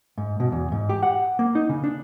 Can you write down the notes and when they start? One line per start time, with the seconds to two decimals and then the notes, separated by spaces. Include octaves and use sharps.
0.18 G#2
0.40 B2
0.52 E2
0.72 G#2
0.89 G4
1.03 F#5
1.39 A#3
1.55 D#4
1.69 C#3
1.84 D4